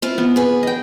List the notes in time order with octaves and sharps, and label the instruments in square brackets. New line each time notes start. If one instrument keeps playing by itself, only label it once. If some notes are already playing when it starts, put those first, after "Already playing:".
[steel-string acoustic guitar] C4 E4 F4
[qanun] B3
[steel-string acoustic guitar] G#4 B4
[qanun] D#5 G5